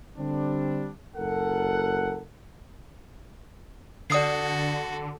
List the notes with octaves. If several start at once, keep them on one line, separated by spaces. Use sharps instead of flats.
D3 G3 C4 D4
F#1 A4 A#4 F#5
D3 F#4 A4 D5 D#6 C7